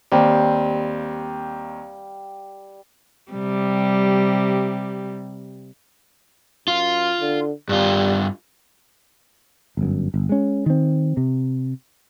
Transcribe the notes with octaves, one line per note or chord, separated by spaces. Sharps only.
D#2 G3 C4 F5
C3 G3
F#2 F4
D3
G2 G3 F4
G1 F#2
G1
G#3 C#4
D#3 C4
C3